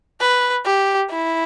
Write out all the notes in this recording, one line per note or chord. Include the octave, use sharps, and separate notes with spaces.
B4
G4
E4